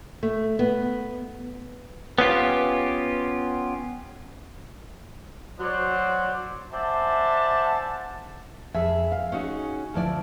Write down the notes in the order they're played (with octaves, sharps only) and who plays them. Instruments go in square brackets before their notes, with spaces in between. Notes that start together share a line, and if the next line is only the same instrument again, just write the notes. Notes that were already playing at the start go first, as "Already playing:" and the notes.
[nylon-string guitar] A3
B3
[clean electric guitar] B3 C#4 F4 G4
[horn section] F#3 C5 D5
C5 D5 E5 F#5 G#5 A5
[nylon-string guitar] F2 G#4 E5
F5
C#4 D#4 F#4 G#4
D2 F3 E4 D5